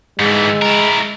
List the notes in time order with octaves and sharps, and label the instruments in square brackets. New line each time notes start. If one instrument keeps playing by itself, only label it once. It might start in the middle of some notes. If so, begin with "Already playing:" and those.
[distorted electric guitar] G#2 E3 [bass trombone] G#3
[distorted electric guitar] E4 A#4